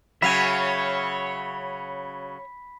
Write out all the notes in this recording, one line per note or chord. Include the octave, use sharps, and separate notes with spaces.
C#3 F#3 C#5 E5 F5 G#5 B5 B6